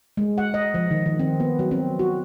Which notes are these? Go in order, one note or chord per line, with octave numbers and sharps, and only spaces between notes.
G#3
F#5
D#5
F3
D#3
D#3
C4
B3
F#3
C4
F#4